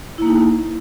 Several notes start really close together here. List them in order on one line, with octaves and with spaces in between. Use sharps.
E4 A#3 D#4